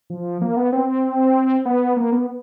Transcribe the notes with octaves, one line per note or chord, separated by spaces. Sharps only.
F3
A#3
B3
C4
B3
A#3
B3